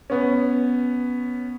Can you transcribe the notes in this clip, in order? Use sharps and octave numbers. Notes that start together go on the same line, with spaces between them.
B3 C#4